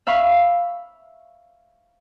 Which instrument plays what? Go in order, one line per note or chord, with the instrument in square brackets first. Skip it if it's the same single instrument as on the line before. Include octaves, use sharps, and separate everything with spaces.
[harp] E5 F5 B5 C#6